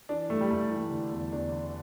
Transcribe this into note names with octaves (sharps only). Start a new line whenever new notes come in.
E3 D4
G2 A3
G3
G2 A3
E3
D3
E2
E2 D4
D3